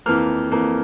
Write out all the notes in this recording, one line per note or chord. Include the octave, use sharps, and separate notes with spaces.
F2 E3 A#3 F6
F2 E3 A#3